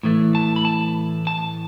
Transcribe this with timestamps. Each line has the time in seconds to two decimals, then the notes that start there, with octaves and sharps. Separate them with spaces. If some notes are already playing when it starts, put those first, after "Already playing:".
0.03 A2 E3 A3
0.35 A5
0.56 B5
0.65 A5
1.27 A5